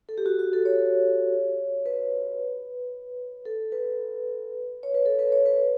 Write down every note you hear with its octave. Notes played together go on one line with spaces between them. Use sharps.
A4
G4
F#4
F#4
A4
C#5
B4
A4
B4
C#5
B4
A4
B4
C#5
B4